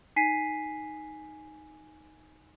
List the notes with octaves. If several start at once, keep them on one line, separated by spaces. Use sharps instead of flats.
D#4 G#5 B6 C7 D#7